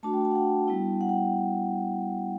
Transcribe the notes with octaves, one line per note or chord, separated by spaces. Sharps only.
A3 D4 F#4 A5
G5
A5
F#5
G5
G3 B3 E4
F#5
G5